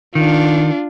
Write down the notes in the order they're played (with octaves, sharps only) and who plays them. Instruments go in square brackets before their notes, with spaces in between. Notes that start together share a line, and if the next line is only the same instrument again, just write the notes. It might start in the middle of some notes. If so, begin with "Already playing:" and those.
[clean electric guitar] D#3 [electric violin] D4 F4